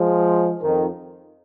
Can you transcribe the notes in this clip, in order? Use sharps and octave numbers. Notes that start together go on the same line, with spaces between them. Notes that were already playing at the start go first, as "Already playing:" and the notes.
Already playing: F3 G#3
F2 D#3